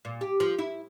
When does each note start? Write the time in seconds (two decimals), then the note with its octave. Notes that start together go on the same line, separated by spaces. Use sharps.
0.05 A#2
0.21 G4
0.40 F3
0.59 E4